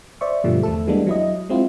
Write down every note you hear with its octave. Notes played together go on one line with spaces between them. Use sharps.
C5 D5 E5 C#6
G2 B2 D3 F3 G3 A3
E2 A3 A4
E3 G3 G#3 A#3 B3 D4
F#3 E4 D#5
G#3 C4 E4 F4